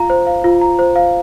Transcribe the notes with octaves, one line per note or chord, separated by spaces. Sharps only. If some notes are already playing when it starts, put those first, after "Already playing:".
Already playing: F4 F5 A#5
C5
F5
F4
A#5
C5
F5